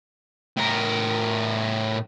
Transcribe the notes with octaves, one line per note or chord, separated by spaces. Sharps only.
A2 A#4